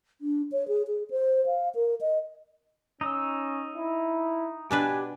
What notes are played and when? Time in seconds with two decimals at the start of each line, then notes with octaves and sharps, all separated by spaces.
0.21 D4
0.52 C#5
0.68 G#4
0.87 G#4
1.11 C5
1.46 F5
1.75 A#4
2.01 D#5
3.01 C#4 D#4 D#6 E6
3.76 E4
4.71 B2 D4 G4 B4 G#5